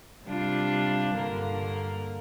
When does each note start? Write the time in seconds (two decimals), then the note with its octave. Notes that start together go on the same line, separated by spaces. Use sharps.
0.25 C3 G3 D4 F4
1.14 G2 D3 A#3